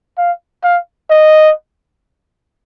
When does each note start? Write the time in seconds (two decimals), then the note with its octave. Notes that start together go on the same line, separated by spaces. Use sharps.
0.18 F5
0.64 F5
1.10 D#5